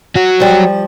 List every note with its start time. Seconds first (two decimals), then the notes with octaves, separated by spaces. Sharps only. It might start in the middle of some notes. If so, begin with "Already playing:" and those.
0.15 F#3 F#4
0.40 F3 G3